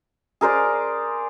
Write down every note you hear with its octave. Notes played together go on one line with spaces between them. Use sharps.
G#4 A#4 C5 D5